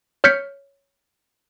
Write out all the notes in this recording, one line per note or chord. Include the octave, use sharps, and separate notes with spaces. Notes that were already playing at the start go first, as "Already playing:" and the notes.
C#5 F6 G6 B6 C#7